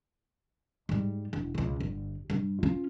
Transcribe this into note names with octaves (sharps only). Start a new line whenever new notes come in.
G#2 G3
E1
C#2 B2
G1
G2 G3
C#4 F4